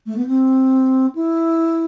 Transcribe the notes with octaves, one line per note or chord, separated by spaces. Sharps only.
A3
B3
C4
E4